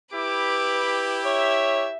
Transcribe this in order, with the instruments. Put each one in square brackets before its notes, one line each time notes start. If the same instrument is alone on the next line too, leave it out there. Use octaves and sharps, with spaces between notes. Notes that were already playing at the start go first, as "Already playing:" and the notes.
[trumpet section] E4 G4 [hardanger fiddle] B4 D6
[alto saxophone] C#5 [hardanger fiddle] E5